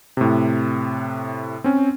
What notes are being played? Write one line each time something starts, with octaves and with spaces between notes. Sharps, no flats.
A2 C3
C4 C#4